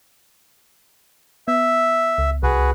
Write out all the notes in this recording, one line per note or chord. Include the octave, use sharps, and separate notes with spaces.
B3 E5
C#2
C2 F#4 G#4 B4